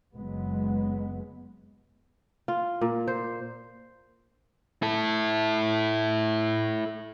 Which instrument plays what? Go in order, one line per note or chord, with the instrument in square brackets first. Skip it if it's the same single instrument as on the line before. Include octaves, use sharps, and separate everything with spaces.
[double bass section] F#1 F#3 G#3 B3
[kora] F4
A#2
C5
[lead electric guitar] E4 A4